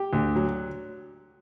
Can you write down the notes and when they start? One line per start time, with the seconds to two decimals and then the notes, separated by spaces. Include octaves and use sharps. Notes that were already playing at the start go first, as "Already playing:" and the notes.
Already playing: G4
0.13 D2
0.36 F#3